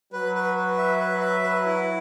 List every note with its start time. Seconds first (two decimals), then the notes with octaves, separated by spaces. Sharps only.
0.13 F#3 B4
0.35 B4
0.56 B4
0.78 E5
1.00 B4
1.21 E5
1.43 B4
1.66 E4